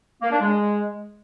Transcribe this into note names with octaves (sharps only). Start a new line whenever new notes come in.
A#3
D4
G#3